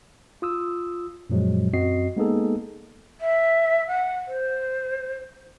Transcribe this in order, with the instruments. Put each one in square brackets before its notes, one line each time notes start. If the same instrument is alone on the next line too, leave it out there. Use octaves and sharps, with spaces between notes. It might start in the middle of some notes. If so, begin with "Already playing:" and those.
[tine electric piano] F4 D#6 E6
F#2 A#2 F3 F#3 G#3
F#2 C4 F#4 D#5 C7
G#3 A#3 B3 D#4 G#4 A4
[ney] E5
F#5
C5